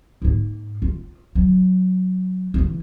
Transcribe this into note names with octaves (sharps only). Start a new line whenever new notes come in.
G#2 A#3
F4
F#3
C#3 E3